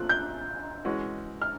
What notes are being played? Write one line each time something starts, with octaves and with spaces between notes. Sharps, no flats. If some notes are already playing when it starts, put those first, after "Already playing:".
Already playing: A#2 F3 A3 C4 F4 F#6
G6
E3 G#3 C#4 F#4
F6